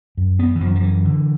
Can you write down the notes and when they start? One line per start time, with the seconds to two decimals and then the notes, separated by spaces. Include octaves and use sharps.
0.17 F#2
0.39 B3
0.56 E3
0.60 F#2 F3
0.75 F3
0.83 E3
1.05 D3